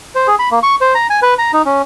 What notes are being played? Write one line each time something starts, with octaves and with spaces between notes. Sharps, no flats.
C5
G#4
B5
A#3
C#6
C5
A#5
G#5
B4
A#5
D#4
C#4